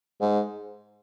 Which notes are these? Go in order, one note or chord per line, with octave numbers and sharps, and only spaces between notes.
G#2